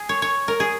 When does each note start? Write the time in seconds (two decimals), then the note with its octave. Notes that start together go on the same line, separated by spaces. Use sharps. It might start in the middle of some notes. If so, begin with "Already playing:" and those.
Already playing: G#4
0.09 C#5
0.22 C#5
0.48 A#4
0.60 G#4